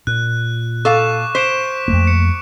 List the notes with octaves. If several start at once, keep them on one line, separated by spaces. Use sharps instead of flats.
A#2 F#6
A4 F5 C#6 D6 E7
C5 B6 D7 E7
F2 A3 A#3
C#7